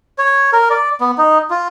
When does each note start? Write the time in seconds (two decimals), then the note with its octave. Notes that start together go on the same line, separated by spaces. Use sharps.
0.18 C#5
0.53 A#4
0.70 D5
1.01 B3
1.18 D#4
1.50 F4